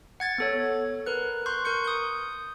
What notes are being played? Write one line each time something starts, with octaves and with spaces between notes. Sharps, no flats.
F#5 G#6 A6
B3 A4 C#5
A#4 B4 F#6
C6 C#6 F#6 G6
A#4 C#6 G6 C#7
D#6 G6